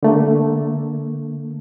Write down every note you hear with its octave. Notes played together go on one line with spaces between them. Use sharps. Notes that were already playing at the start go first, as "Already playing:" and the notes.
D3 A3 A#3